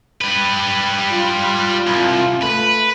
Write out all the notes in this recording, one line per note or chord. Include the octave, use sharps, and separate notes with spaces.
G3 B4
F4
C2
A3 B4